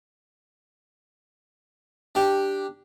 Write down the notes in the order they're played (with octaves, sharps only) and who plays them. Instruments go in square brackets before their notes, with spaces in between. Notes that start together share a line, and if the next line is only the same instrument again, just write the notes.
[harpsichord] D4 G4